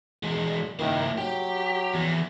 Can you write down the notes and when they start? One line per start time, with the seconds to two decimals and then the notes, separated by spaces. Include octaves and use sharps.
0.23 E3 G#3
0.79 D#3 A#3 E4
1.18 F#3 G4
1.94 E2 E3